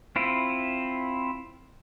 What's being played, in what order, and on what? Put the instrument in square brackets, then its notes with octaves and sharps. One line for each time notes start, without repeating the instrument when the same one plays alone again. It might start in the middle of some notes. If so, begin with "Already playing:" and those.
[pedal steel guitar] C4 E4 F4